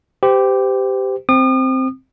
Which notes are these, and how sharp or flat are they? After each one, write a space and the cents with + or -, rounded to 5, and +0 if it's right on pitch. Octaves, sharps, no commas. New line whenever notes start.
G4 +0 C5 -35
C4 +0 D#6 -40